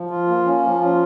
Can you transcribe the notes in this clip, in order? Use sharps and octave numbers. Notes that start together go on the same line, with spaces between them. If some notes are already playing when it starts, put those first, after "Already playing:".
Already playing: F3
F4
A#3
C#4
F3
F4